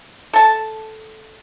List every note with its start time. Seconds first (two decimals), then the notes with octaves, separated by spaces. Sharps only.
0.33 A4 A5